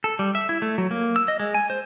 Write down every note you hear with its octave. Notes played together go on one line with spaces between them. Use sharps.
A4
G3
E5
E4
A3
F#3
A#3
E6
D#5
G#3
G#5
C5